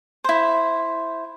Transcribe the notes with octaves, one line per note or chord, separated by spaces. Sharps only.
E4 C5